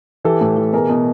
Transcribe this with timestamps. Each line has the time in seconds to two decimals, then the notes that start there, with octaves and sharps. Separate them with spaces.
0.24 E3 G4 A4
0.41 A2
0.57 E3
0.73 B2 G#4 A#4
0.89 B2